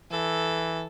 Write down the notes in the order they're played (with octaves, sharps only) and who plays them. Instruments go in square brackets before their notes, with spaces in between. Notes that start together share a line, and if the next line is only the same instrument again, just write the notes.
[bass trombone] E3 [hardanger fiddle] A4